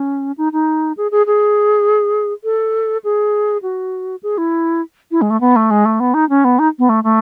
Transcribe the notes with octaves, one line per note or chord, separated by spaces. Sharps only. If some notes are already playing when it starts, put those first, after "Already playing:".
Already playing: C#4
D#4
D#4
G#4
G#4
G#4
A4
G#4
F#4
G#4
E4
E4
G#3
A3
B3
A3
G#3
A3
B3
D#4
C#4
B3
D#4
B3
A3
A3